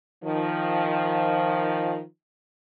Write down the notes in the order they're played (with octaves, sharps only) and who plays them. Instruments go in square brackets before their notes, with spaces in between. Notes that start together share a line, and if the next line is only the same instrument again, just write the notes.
[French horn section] D#3 F3